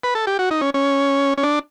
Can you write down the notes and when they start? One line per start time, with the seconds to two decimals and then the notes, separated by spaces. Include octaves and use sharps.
0.04 B4
0.15 A4
0.27 G4
0.39 F#4
0.51 D#4
0.61 C#4
0.74 C#4
1.38 C#4
1.43 D4